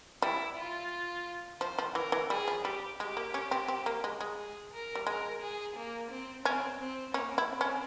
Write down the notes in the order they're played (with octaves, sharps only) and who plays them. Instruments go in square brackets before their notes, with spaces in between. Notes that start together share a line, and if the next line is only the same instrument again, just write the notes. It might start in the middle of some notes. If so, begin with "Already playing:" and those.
[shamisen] G3 [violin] E4
[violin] F4
[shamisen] F3 [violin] C5
[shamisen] F3
[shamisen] E3 [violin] A#4
[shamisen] E3
[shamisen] G3 [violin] G#4
[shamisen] F3
[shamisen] G3 [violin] G4
[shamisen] G#3 [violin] G4
[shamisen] A#3
C#4
C4
C4
A#3
G#3
G#3
[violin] G#4
A#4
[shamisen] G3
[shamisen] G#3 [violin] A#4
[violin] G#4
A#3
C4
[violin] C4 [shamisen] C#4
[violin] C4
[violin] A#3 [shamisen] C#4
[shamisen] E4
[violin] C4
[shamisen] C#4